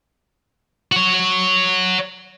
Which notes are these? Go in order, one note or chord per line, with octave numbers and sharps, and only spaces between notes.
F#4 C#5